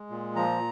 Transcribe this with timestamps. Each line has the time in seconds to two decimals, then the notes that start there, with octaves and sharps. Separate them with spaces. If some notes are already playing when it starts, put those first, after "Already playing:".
Already playing: G#3
0.10 A#2
0.36 F3 A#5